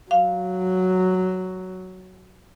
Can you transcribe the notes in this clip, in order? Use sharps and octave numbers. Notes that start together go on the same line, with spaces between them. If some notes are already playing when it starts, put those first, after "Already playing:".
F#3 F5